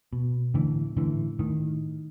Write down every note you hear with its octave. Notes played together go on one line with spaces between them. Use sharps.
B2
A2 D3 E3
A2 D3 E3
A2 D#3